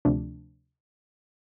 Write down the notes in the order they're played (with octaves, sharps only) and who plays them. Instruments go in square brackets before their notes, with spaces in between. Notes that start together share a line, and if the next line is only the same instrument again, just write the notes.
[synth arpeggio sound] D2 C3 F3 A3 D4